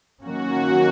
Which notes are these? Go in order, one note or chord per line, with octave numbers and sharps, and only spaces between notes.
D#3 F#3 A#3 C#4 F#4